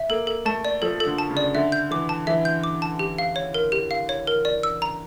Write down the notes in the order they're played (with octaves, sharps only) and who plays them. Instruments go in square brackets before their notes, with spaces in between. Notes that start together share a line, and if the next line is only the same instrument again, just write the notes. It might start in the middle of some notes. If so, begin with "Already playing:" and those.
Already playing: [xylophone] E5
[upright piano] A#3 [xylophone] A4
[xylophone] A4
[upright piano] A3 [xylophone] A5
[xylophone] D5
[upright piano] F3 [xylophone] A4
[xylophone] A4
[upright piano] D3
[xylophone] A5
[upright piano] C#3
[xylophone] D5
[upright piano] D3 [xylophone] E5
[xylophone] G6
[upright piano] E3 [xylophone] D6
[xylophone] A5
[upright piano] E3 [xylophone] E5
[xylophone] G6
D6
A5
G4
F5
C#5
A#4
G4
F5
C#5
A#4
D5
E6
A#5